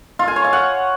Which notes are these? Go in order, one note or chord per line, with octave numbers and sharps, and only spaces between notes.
F4
G#5
C#5
F5
F#5